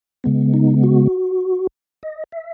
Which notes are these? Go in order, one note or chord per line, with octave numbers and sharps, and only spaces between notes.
C#3 G#3 B3
D#4
F#4
D#5
E5